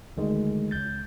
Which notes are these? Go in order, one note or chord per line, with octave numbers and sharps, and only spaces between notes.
D2 D#3 G#3
C#2 G6 A6